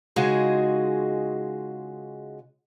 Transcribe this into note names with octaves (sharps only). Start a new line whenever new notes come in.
C#3 G#3 D#4 F4 F#4 G#4